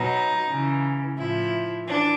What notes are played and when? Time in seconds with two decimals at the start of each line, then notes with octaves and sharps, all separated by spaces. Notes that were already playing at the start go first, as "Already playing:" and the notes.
Already playing: B2 F#3 D#4
0.48 C#3 E3
1.17 A2 F3 E4
1.85 E3 D4